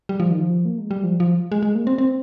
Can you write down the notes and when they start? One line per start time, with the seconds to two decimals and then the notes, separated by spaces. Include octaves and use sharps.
0.09 G3
0.20 F3
0.31 D#3
0.41 F3
0.65 A#3
0.78 G#3
0.91 G3
1.04 F3
1.20 F3
1.52 G#3
1.63 G#3
1.75 A#3
1.87 C4
1.98 C4